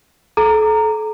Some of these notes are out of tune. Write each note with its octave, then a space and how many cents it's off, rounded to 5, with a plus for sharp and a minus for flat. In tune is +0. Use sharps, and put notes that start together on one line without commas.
A4 -35 A#5 -15 D6 +0